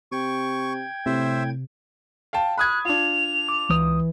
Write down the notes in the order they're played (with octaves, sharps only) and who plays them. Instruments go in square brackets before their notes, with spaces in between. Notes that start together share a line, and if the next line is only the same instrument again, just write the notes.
[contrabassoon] C3 [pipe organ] G5 G#6 [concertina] C#6
[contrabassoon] A2 [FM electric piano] C3 [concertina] C5 E5
[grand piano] F5 G5 A5
[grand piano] B5 D#6 G#6 [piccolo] F#6
[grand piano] D4 F4 [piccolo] F7
[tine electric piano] D6
[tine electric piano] C#2 D#6 [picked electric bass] E3